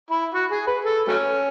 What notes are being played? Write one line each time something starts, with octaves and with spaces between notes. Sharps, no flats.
E4
F#4
G#4
B4
A4
F#3 A3 C#4